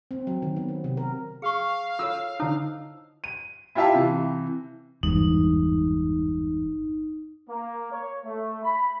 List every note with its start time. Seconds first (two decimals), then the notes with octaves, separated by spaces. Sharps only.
0.11 C4
0.27 F#3
0.42 D#3
0.57 B3
0.68 C4
0.84 C3
0.97 A#4
1.42 G#4 F5 C#6
1.99 F4 A4 C#5 E6
2.40 D3 D#4 E4 C5 A5
3.24 D#7
3.75 E4 F4 G4 E5 F5 A5
3.94 C3 E3
5.03 G1 E2 G#2 D#4
7.49 A#3
7.92 C#5
8.25 A3
8.63 B5